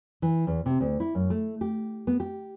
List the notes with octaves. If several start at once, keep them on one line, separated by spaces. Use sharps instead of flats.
E3
E2
C3
D2
E4
F#2
A3
G4
B3
G4